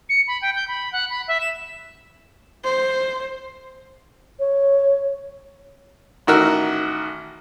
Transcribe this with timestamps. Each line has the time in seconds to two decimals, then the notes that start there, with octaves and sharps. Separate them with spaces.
0.09 C#7
0.28 B5
0.42 G5
0.56 G6
0.68 B5
0.92 F#5
1.10 B5
1.28 E5
1.41 E7
2.64 C5
4.39 C#5
6.27 A1 D#3 F#4 A#4 E6 F6